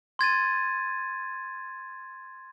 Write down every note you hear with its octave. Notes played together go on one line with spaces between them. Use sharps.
C6 G#6 A6 D#7